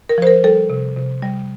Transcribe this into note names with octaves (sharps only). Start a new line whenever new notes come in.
A#4
F3 C5
A#4
G3 A4
C3
C3
G3